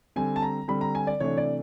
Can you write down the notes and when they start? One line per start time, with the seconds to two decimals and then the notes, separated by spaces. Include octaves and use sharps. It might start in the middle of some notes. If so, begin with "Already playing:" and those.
0.16 D3 G3 C4 G#5
0.36 A5
0.42 A#5
0.68 D3 G3 C4 B5
0.81 A#5
0.95 G#5
1.07 D5
1.20 C3 E3 A3 D4 C#5
1.37 D5